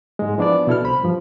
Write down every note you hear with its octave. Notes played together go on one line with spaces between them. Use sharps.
G#2 G#3
F3 B3 D4 E4 D5
B2 E4 A4 F6
C2 C5 B5
G2 F3